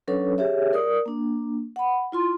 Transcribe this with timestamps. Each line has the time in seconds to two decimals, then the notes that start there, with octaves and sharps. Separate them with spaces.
0.08 F#3 C#4 D4 A4 B4 C#5
0.38 G4 G#4 C#5 E5
0.73 A#4 D5 D#6
1.06 A#3 D4
1.76 F#5 B5
2.12 E4 F4 C6